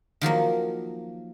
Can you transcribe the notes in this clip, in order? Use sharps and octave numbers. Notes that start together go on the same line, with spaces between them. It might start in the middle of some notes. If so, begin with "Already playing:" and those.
D#3 F3 F#3 A#3